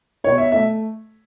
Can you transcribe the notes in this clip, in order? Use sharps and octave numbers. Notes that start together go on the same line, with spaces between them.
B2 C#5
E5
A3 E5